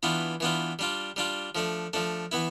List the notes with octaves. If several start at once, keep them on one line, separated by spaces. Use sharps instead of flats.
E3 B3 D4 F4
E3 B3 D4 F4
G3 D4 F4
G3 D4 F4
F3 A3 D4
F3 A3 D4
E3 B3 E4